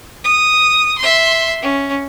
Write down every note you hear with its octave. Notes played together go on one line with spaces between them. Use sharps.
D#6
E5 C6
C#4